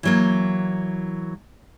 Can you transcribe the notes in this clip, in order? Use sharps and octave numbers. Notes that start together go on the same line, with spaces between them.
E3 F#3 A#3